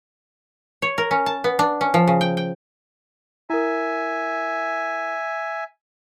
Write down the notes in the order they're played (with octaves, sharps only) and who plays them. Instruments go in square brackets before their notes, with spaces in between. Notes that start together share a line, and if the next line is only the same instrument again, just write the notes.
[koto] C#5
A#4
C#4
A5
B3
D4
C#4
F3
C#3
G5
G5
[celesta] E4 A#4 [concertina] E5 G#5